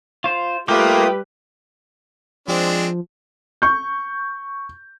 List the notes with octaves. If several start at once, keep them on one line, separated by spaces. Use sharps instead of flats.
F4 C5
G3 A3 A#3 F4 G4 B4 G5 D#6
F3 G#3 C4 D4
C#6 G6